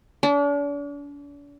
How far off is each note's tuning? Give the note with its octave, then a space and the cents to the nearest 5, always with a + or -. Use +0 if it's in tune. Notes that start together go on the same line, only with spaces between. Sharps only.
D4 -40